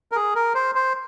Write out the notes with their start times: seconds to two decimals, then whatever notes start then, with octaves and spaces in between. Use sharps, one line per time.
0.12 A#4
0.16 G#4
0.35 A#4
0.55 C5
0.75 C5